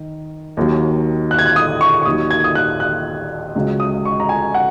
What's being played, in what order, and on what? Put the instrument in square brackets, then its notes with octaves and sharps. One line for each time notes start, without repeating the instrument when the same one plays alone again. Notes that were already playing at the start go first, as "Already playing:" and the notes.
Already playing: [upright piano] D#3
D#2 D#3 F#3
F#6
G#6
F#6
D#6
C#6
C#6
D#2 D#3 F#3 D#6
G#6
D#6
F#6
F#6
C#2 C#3 F#3
D#6
C#6
A#5
G#5
F#5